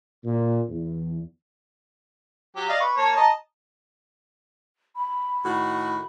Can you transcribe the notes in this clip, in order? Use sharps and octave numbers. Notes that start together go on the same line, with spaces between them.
A#2
E2
F#3 G4
D5 D#5 F5
B4 C#6
A#3 C#5 A5
D#5 A5 A#5
B5
A2 D#3 F#4